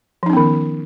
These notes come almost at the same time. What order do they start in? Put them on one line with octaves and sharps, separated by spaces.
F3 D#4 C#4 B3 D#3